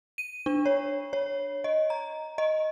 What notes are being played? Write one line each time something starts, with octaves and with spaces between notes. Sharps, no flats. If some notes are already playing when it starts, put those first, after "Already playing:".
D#7
D4
C#5
C#5
D#5
A#5
D#5